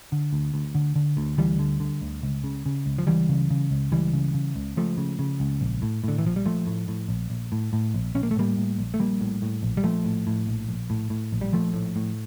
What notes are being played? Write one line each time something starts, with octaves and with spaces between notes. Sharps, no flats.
D3
D2
D2
D3
D3
D2
D2 E3 G3
D3
D3
D2
C#2
C#3
C#3
C#2
F3
C#2 E3 G3
C#3
C#3
C#2
C#2 E3 G3
C#3
C#3
C#2
C#2 F3 A3
C#3
C#3
C#2
A#1
A2
A2 D3
E3
A#1 F3
G3
A#1 F3 A3
A2
A2
A#1
A#1
A2
A2
A#1
A#1 C#4
A#3
A3
A2 G3 A#3
A2
A#1
A3
A#1 G3 A#3
A2
A2
A#1
G3
A#1 F3 A3
A2
A2
A#1
A#1
A2
A2
A#1
G3
A#1 F3 A3
A2
A2